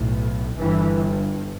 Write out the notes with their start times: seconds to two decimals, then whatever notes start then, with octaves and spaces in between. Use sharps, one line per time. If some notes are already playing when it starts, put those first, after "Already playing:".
Already playing: B1 A2
0.56 G1 G2 E3